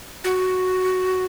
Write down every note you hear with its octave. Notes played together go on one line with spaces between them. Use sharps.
F#4